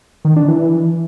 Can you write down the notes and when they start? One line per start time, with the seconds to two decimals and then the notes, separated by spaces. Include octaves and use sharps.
0.25 D#3
0.36 D4
0.48 E3